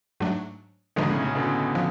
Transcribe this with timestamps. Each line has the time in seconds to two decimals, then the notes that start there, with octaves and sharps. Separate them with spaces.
0.20 G#2 F#3 A3 D4
0.96 G#2 B2 D3 F3 G#3 B3 D4
1.10 A2 C#3
1.22 A2 C#3
1.35 B2 D3
1.75 F3